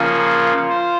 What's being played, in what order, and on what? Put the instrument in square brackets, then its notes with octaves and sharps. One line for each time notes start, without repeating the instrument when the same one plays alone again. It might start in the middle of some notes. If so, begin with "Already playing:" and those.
Already playing: [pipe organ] C#3 F3 A#3 C#4 [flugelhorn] F4
[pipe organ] C5